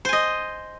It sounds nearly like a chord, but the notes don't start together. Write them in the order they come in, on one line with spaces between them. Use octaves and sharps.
C5 G#5 D#5